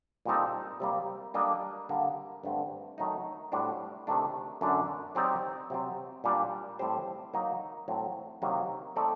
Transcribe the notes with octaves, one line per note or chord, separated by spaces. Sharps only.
A#2 G3 C4 D#4 A4
C3 G3 A#3
G3 A#3 D4 A4 D#5
D3 G3 A#3
G2 D3 A3 C4
D#3 F#3 A3 D#4
A2 G3 D4 F#4 C5
C3 D#3 A3 D4
F#2 D3 A3 D4
F#3 C4 D#4 G4 D5
C3 F#3 C4
A#2 G3 D4
A2 G3 C4 G4 C5
F#3 A#3 D#4
A2 F#3 C4
C3 D#3 F#3 A#3 D#4
A3 C4 D#4 A4 D5